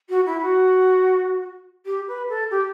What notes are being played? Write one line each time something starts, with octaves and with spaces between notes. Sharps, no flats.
F#4
E4
F#4
G4
B4
A4
G4